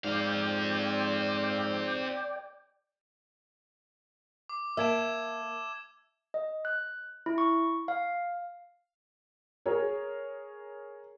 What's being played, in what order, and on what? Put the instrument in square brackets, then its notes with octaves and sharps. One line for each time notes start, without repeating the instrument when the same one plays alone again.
[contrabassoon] G#2 [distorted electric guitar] C4 F5 [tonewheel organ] D5 G5
[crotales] D6
[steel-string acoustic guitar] A#3 [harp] E5 A5 D7 [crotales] E6 G#6 E7
[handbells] D#5
F#6
E4
C#6
F5
[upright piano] G#4 A#4 C#5